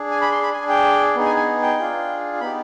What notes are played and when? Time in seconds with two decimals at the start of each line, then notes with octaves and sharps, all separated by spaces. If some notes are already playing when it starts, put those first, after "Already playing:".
Already playing: D4 G#4
0.11 G#5
0.22 B5
0.32 C6
0.42 B5
0.53 D4 G#4 G#5
0.69 G5
1.16 B3 D#4 G#4
1.26 G#5
1.37 G#5
1.62 G5
1.78 D4 F4 G#4
2.41 B3 D#4 G4 B5